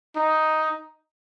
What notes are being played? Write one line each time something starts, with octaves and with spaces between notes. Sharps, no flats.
D#4